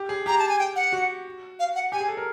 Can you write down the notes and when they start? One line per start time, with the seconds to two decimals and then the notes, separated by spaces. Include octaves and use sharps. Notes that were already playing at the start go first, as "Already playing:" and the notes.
Already playing: G4
0.09 G#4
0.26 G4 A#5
0.39 A5
0.49 G#5
0.59 G5
0.76 F#5
0.93 F#4
1.59 F5
1.75 F#5
1.92 G4 G#5
2.00 G#4
2.08 A4
2.17 A#4